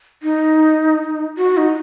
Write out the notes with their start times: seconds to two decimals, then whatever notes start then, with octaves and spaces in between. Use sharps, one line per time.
0.23 D#4
1.38 F#4
1.57 D#4